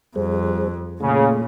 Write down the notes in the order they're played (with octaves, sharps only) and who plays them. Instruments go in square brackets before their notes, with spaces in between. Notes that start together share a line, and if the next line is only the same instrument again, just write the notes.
[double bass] F2 [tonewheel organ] G3 G#4 C5
[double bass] A#2 [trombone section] C#3 [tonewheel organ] A3 G#4